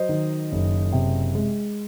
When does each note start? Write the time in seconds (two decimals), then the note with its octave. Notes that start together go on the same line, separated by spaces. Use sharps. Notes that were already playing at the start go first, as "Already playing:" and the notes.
Already playing: F#3 C5 D#5
0.09 D#3
0.52 F#1
0.92 C3
1.35 G#3